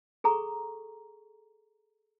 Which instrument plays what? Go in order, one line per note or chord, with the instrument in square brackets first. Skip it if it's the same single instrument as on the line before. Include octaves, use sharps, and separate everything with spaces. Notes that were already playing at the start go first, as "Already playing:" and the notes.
[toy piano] G#4 A4 A#5 C#6